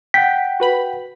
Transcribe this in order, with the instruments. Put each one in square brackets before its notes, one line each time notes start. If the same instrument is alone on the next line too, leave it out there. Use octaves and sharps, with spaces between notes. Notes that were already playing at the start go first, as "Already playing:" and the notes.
[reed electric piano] F#5 G5 [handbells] B6
[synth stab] F#4 B4 B5